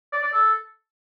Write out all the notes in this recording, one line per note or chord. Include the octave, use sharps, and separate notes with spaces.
D5
D5
A4